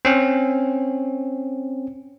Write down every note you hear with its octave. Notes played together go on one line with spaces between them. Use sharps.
C4 C#4